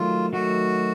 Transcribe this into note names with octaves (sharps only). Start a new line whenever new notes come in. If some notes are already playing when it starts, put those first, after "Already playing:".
Already playing: D#3 F#3 A3 F4
D#3 F#3 A3 F#4